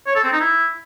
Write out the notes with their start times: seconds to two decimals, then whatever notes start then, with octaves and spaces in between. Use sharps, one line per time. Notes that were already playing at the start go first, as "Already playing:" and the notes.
0.07 C#5
0.15 A4
0.24 C4
0.32 D#4
0.41 E4